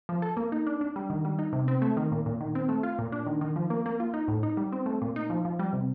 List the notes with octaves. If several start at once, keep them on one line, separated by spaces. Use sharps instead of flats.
F3
A4
A#3
D#4
D4
D4
G3
D#3
G3
D#4
C3
C4
A3
D#3
A#2
A#2
D#3
C4
A3
F4
A#2
D4
D#3
D#3
F3
A#3
A#3
F4
D#4
A2
D#4
G3
C4
A3
A#2
D#4
F3
F3
G3
C3